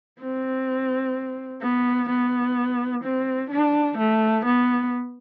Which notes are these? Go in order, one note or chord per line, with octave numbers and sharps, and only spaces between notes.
C4
B3
B3
C4
D4
A3
B3